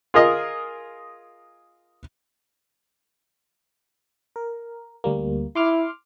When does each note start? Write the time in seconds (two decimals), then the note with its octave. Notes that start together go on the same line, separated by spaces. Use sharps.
0.14 F4 G#4 A#4 D#5
4.36 A#4
5.04 D2 G3 A#3
5.56 E4 C6 D6 F6